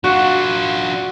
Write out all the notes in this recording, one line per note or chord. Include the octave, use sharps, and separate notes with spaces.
D4 F4 F#4